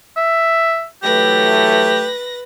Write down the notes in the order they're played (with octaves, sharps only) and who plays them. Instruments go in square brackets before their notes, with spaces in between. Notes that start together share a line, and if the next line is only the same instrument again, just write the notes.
[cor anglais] E5
[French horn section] E3 F#3 A3 [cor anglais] G4 [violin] B4 A#6